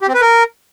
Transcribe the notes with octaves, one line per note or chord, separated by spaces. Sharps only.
G4
C4
B4
A#4